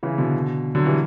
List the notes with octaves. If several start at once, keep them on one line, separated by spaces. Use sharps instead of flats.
C#3 E3
B2 D3
D3 F#3
E3 G3